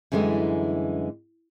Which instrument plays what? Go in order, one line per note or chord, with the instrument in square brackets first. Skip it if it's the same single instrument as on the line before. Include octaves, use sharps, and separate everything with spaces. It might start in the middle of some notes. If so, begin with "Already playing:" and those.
[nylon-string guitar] F#2 D3 E3 G3 G#3